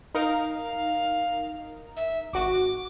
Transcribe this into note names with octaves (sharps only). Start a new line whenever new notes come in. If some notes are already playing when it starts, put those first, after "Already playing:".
D#4 A#4 F5
E5
G#1 F#4 D6